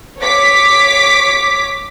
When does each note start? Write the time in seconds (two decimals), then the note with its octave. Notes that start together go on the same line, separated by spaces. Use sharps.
0.20 C#5 D6 B6